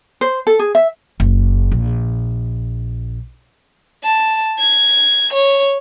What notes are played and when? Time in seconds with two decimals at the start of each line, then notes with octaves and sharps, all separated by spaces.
0.21 C5
0.47 A4
0.59 G#4
0.75 E5
1.20 F#1
1.72 A#1
4.04 A5
4.59 G#6
5.33 C#5